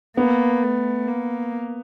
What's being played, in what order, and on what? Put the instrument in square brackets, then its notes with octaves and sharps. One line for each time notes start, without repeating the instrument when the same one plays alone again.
[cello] A#3 [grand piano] B3
[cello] A3
A#3